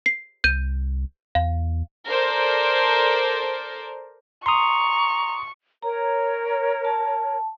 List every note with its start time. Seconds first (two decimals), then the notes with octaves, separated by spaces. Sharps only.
0.06 C7
0.44 C2 G6 D#7
1.35 E2 F5
2.08 A4 A#4 C5 D5
4.46 A#5 C6 C#6 D#6
5.82 A#4 C#5 A#5
6.85 A5